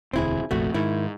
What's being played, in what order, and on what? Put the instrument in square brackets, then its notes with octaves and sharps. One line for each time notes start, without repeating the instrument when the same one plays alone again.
[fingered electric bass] E1 D2 [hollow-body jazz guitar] C4 E4 G#4
[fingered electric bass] F1 A#1 F2 [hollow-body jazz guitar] A3 F#4
[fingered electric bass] G#2 [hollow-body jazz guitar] D#3 E4